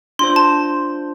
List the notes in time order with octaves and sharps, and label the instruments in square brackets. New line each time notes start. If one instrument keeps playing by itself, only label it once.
[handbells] D4 F4 C5 [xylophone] C6
[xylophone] A5